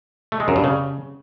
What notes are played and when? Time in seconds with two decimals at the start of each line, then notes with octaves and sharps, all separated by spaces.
0.32 A3
0.40 G#3
0.48 F#2
0.56 G2
0.64 C#3